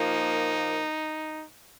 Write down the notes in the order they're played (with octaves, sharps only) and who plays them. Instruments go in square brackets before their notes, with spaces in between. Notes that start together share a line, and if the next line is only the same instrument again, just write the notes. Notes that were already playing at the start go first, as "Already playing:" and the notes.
Already playing: [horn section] A#2 F3 A#3 D#4